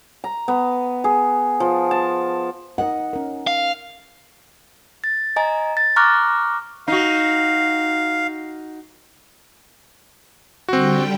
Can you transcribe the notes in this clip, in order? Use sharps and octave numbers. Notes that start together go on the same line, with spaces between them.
A#5
B3
G#4
F3
A5
D#4 A#4 D#5 F#5
C#4 A#4
F5
A6
D#5 G#5 A#5
A6
A#5 C#6 D6 F6 F#6 A#6
D#4 F#4 F5
D3 G3 C4 F#4 G5